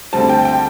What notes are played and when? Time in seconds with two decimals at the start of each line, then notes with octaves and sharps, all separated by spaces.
0.13 D2 D3 G3 C4 A5
0.29 G5
0.45 G5